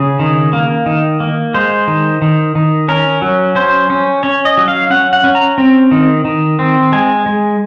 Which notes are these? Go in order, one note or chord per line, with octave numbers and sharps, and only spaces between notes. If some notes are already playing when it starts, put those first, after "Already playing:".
Already playing: C#3 G#4
D#3
A#3
D#3
A#3
G#3 C5
D#3
D#3
D#3
C#4 A#4
F#3
C#4 C5
C#4
C#4 C#5
D#5
F#3
F5
C#4 F#5
F#5
C#4
A#5
C4
D#3
D#3
C4
G#3 G#5
G#3